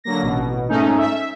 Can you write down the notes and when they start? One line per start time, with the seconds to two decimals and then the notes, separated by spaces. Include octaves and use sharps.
0.04 D3 F#3 A#3 A#6
0.22 A1 B2
0.69 G#2 A3 C#4 D#4
0.98 E5